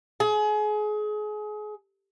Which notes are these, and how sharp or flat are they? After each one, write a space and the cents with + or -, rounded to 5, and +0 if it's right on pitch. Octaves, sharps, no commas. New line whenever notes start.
G#4 +30